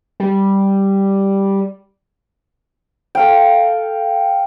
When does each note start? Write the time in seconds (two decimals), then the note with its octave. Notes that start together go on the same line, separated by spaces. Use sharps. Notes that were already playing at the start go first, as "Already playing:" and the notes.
0.20 G3
3.15 A4 F5 G5